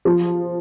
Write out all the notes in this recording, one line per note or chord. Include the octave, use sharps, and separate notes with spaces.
F3